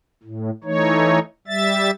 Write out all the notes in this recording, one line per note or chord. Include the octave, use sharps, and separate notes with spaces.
A2
E3 A3 D#4 C#5
G3 E5 A6